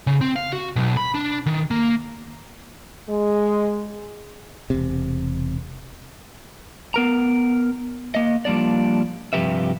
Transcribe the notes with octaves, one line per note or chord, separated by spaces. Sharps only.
C#3
C4
F5
F#4
B1
B5
D4
D#3
A#3
G#3
E1 C3
B3 A#4 A#5
A#3 D#5
F3 G3 A#3 D4 D5
G2 C3 F3 G4 B4 E5